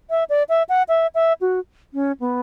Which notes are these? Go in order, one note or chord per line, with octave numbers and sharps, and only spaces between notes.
E5
D5
E5
F#5
E5
E5
F#4
C#4
B3